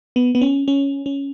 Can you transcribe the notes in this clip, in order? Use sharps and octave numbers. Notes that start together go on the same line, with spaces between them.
B3
B3
C#4
C#4
C#4